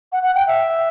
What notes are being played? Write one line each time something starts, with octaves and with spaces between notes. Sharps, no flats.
F#5
F#5
G5
E5